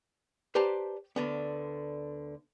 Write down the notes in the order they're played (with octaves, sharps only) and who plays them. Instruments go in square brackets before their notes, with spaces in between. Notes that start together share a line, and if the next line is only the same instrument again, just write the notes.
[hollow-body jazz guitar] G4 B4 C5 D5 A5 A#5
D2 D3 B3